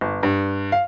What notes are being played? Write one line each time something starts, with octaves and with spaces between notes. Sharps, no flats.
G1
G2
F5